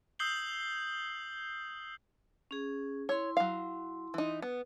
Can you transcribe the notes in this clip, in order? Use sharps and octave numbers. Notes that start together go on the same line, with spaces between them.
D#6 E6 G6 C7 F#7 G7
C#4 G#4
E4 C#5 C6
F#3 F5
E3 D#4
B3